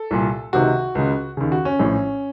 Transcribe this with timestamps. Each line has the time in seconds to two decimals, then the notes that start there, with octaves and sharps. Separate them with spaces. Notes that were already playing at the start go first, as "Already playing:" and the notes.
Already playing: A4
0.11 C2 A#2
0.53 C#2 C3 D#3 F#4
0.95 C#2 C#3
1.37 D#2 C#3
1.52 F#4
1.65 C#4
1.79 A#1 A2